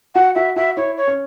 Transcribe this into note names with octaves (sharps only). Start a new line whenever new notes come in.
F#4 F#5
F#4 E5
F#4 E5
E4 C#5
C#5
C#4